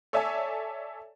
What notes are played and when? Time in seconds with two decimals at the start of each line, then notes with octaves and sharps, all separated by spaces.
0.13 A4 C#5 D5 E5 G#5 A5